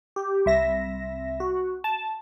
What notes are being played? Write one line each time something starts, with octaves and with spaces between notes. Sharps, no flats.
G4
C2 E5 A#6
F#4
A5